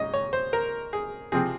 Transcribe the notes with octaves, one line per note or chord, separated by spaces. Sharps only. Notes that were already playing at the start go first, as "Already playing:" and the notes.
Already playing: G#2 C#4 D#5
C#5
C5
A#4
G#4
C3 F3 C4 G#4